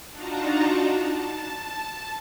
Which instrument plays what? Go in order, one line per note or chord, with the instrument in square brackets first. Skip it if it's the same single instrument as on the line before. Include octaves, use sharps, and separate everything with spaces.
[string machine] D4 D#4 F4 F#4 A5 A#5
A5